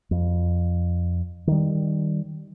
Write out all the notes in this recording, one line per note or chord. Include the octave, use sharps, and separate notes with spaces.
F2
D#3 G3